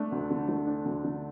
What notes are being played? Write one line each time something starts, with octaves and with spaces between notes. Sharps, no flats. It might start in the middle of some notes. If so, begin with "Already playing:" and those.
Already playing: A3 D4
D2
D3
A3
D4
D2
D3